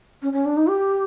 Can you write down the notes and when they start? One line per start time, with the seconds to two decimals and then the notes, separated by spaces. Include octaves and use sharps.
0.22 C#4
0.33 C#4
0.45 D4
0.57 D#4
0.67 G4